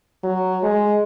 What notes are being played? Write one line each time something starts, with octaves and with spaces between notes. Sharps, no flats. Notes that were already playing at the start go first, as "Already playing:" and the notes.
F#3
G#3